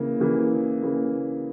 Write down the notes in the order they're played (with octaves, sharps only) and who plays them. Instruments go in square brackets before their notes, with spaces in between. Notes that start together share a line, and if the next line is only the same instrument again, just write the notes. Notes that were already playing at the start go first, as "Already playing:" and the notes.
Already playing: [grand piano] C#3 E3 A#3
C#3 E3 A#3
C#3 E3 A#3